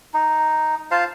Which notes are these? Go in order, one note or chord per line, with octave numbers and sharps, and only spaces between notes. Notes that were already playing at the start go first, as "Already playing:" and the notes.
D#4
F4 C5 F5 A5